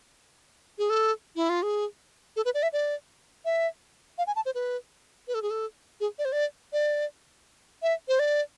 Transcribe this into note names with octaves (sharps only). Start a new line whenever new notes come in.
G#4
A4
E4
F4
G#4
A4
B4
D5
E5
D5
E5
F5
G#5
A5
C5
B4
B4
A4
G#4
A4
G#4
D5
C5
D5
D5
E5
C5
D5